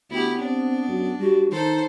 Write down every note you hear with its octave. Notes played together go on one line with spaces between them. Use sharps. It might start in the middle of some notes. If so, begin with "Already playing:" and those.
D2 B3 E4 G4
C4 D4
F#2
G3 F#4
D#3 D#4 A4 C5